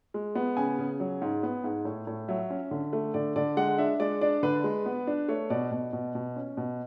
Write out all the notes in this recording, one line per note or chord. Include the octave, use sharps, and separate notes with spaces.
G#3
B3
C#3 G#5
C#3
F#3
G#2
B3
G#2
A2
A2
F#3 E5
C#4
D3
A3
D3 D5
D3 D5
G#3 F#5
D4 E5
G#3 D5
D4 D5
D3 B4
G#3
B3
D4
A3 C#5
B2 D5
B2
B2
B2
C#4
B2